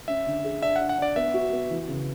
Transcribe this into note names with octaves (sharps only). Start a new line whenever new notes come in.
C#4 E5
D3
G#4
D4 E5
F#5
D4
F#5
D4 D5
B3 E5
F#4
B3
E3
C#3